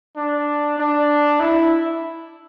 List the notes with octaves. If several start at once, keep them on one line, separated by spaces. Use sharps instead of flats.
D4
D4
E4